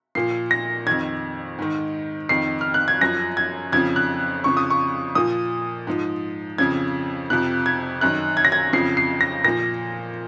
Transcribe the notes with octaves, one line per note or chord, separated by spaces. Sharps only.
A#2 F3 C7
A#6
F2 D#3 G#6
G#2 D#3
F2 D#3 C7
F6
F#6
G#6
F#2 F3 A#6
G#6
F2 C#3 F3 G#6
F#6
F2 C#3 F3 C#6
D#6
C#6
A#2 F3 D#6
G#2 F3
F2 C#3 F3 G#6
F2 C3 F3 F#6
G#6
F#2 D#3 F#6
G#6
A#6
G#6
F2 C#3 F3 C7
C7
A#6
A#2 F3 A#6